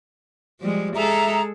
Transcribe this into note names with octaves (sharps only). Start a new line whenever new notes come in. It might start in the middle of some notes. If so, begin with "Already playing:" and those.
F3 G3 G#3
G#3 G#4 A4 E5 A#5